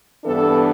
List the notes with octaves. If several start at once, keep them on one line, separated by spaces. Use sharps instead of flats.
G2 E3 B3 D4 A4